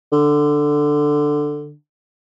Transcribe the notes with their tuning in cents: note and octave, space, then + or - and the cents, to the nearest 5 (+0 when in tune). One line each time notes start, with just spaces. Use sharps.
D3 +10